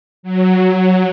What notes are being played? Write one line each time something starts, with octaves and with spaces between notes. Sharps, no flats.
F#3